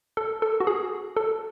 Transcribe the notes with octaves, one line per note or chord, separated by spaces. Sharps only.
A4
A4
F#4
G#4
A4